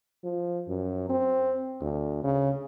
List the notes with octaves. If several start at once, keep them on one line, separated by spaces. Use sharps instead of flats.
F3
F#2
C4
D2
C#3